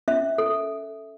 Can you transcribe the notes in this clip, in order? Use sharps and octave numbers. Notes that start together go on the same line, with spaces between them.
C#4 E5
A4